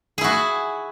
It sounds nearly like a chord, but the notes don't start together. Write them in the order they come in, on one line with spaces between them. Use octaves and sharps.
G#4 E4 F#4